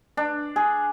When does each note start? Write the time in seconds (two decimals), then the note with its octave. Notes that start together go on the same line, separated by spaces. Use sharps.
0.17 D4
0.56 G#4